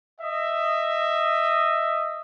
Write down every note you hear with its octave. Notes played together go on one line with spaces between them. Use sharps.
D#5 E5